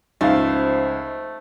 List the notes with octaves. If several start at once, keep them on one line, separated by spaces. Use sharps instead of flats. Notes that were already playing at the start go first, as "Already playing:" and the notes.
C#2 F3 A3 D#4 F5